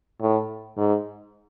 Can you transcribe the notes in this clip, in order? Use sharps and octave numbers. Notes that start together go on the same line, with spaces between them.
A2
G#2